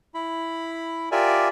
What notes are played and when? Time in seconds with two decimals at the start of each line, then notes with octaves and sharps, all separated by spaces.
0.14 E4 B5
1.12 F4 G4 A#4 D5 E5 G#5